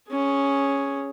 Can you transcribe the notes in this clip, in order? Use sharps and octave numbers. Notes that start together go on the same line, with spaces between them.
C#4 G#4